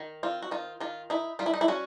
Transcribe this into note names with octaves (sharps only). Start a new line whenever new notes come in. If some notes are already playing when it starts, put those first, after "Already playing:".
Already playing: D#3
C4 F4
F#4
D#3 F4
D#3 F4
D#4 E4
G3 F4
E4
D#4
E4
C#4 F#4